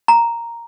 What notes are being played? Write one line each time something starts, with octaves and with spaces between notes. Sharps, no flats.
A#5